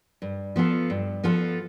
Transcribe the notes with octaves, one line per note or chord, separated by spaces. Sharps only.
G2
F3 B3 F4 A4
G2
F3 B3 F4 A4